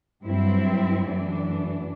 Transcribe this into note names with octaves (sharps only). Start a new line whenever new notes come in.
G2 F#3 C4 E4
F#2 E3 A3 D4